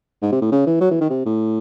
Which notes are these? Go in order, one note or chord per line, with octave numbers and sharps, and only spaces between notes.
G#2
C3
A2
C#3
E3
F#3
E3
D#3
C3
A2